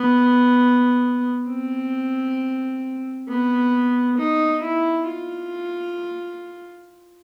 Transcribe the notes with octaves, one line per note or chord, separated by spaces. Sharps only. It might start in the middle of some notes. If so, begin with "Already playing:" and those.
Already playing: B3
C4
B3
D#4
E4
F4